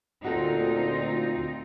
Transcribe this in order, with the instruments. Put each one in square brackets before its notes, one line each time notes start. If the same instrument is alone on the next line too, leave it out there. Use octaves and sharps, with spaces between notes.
[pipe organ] D2 [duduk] A#2 [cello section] C4 D#4 F4 [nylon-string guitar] F#4 A4